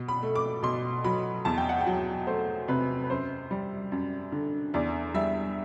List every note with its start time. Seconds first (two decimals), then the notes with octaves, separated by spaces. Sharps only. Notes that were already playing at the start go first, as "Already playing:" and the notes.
Already playing: B2
0.08 B5
0.23 A3
0.35 D6
0.63 B2 C6
1.04 F#3 B5
1.45 E2 A5
1.58 G5
1.69 F#5
1.81 G5
1.86 F#3
2.27 A3 C5
2.68 C3 B4
3.04 B4
3.10 F#2 C5
3.51 G3
3.92 F#2
4.32 D3
4.74 E2 D5
5.14 G3 E5